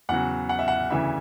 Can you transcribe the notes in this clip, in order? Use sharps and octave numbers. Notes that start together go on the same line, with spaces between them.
E2 C#3 F#3 F#5
F#5
E5
F#5
D2 C#3 E3 E5